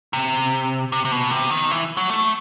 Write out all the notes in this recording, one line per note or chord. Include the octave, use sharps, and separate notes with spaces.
C3
C3
C3
B2
C3
D#3
E3
F#3
A3